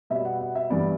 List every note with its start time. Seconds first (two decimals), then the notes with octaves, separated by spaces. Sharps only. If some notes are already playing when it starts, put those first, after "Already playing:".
0.10 B2 G3 B3 E5
0.25 F#5
0.41 F#5
0.55 E5
0.70 G2 E3 G3 B3 D5